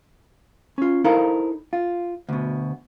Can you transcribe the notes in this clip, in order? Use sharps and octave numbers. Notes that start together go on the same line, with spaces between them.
C#4 F4
D#4 E4 A4 A#4 C5 F5
F4
D2 B2